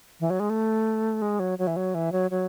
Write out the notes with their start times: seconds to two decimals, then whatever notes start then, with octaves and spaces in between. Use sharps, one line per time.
0.20 E3
0.30 F#3
0.40 G#3
0.50 A3
1.22 G#3
1.40 F#3
1.59 F#3
1.67 E3
1.76 F#3
1.95 E3
2.12 F#3
2.31 F#3